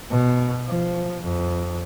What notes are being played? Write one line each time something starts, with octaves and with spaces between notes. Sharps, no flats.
B2
F3
F2